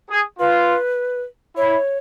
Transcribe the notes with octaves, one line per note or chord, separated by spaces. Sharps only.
G#4
F4 B4
E4 C#5